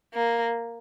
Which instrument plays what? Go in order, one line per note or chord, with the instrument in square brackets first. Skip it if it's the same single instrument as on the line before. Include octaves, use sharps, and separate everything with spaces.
[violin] A#3